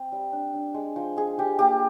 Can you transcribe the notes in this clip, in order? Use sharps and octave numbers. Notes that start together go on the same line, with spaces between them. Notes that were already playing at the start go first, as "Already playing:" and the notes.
Already playing: C4
G3
D4
D4
G#3
F3
G#3 G#4
F3 G4
A#3 G4